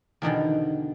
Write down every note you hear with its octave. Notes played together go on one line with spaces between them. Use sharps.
E2 B2 D3 D#3